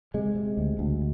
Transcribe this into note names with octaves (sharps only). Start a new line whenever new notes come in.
C3 G#3
C3
D2
D2